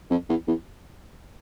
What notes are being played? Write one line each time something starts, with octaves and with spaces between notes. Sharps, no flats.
F2
E2
E2